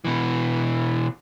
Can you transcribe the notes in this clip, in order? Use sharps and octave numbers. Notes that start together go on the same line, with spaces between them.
B2 E3